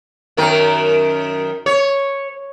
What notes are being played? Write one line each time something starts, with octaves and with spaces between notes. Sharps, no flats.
F#2 D#3 A#4
C#5